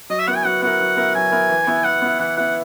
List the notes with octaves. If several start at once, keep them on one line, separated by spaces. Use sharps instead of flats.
F#3 D#5
E5
B3 E4 A#4 F#5
G#5
F#3 F#5
B3 E4 A#4 F#5
F#3
B3 E4 A#4
F#3 G#5
B3 E4 A#4
E3
B3 E4
E3 F#5
B3 E4
E3 F#5
B3 E4 F#5